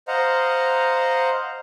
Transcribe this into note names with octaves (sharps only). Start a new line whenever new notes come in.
C5 D#5 F5 F#5 A#5